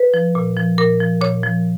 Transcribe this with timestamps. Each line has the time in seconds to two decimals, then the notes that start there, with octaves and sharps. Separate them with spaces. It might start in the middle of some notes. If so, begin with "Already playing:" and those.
Already playing: B4
0.14 F3
0.35 A#2
0.57 F3
0.78 A#2 A#4
1.00 F3
1.21 A#2 C#5
1.43 F3